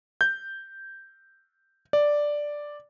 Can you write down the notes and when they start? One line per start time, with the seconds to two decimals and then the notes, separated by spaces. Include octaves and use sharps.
0.21 G6
1.93 D5